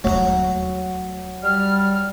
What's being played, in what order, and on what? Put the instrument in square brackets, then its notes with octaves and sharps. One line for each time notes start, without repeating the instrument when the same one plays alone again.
[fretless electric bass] D#1 D#2 A3 [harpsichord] F#3 A#5
[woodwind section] G3 F6